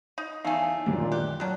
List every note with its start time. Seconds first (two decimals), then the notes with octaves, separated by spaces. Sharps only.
0.18 D#4
0.45 E2 A3 D#4 F5 G#5
0.86 C2 F#2 A#2 D#3 G#3 D4
1.12 G4 F#6
1.40 D#3 F#3 D4 F#6